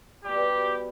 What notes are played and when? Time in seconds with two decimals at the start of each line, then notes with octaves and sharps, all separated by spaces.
0.24 B2 G3 G4